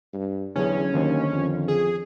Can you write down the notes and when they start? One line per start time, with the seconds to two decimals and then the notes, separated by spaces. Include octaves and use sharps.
0.13 G2
0.56 E2 D3 F#3 C#4 G#4
0.94 D#2 D3 D#3 C5
1.33 F2
1.68 G#4